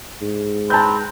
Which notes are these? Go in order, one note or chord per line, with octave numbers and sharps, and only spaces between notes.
G#2
C4 B4 A5 A#5 G6